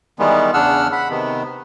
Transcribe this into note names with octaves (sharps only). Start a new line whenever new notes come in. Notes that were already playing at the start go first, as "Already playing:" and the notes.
D#3 E3 G3 G#3 B3
E2 C#3 D4 F#5 E6 F6
F#5 B5
C3 D#3 B3